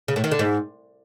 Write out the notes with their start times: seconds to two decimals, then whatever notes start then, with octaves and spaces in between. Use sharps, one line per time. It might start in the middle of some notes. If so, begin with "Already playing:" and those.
0.08 C#3
0.16 A2
0.24 D#3
0.31 D3
0.39 G#2